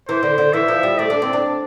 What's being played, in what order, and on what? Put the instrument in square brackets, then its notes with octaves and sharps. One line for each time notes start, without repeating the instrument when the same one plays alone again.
[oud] E3 [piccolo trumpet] C5
[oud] D3
D3
[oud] E3 [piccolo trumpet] E5
[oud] F3
G3
[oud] A3 [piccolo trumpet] D5
[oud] D4
C4
D4